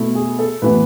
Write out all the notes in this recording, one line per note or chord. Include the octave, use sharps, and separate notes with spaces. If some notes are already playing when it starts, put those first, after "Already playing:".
Already playing: B2 A3 E4
G#4
A4
A2 E3 B3 B4